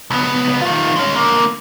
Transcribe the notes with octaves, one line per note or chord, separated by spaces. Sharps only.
C#2 B3
D#3 F4
G#3 C#4
D3 A#3